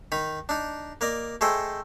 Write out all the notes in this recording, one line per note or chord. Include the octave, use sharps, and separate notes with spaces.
D#3 D#4 B5
D4 D#4
A#3 A#4 D5 D#5
A3 G#4 A4 C5 D#5 G5